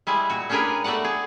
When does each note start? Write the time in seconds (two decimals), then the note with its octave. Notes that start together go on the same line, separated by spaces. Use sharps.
0.07 G3 G#3 E4 G#4
0.30 A#2 F#4
0.49 C#4 D4 G4 G#4 A#4 B4
0.84 A3 B3 F#4 D5 F#5
1.04 G#4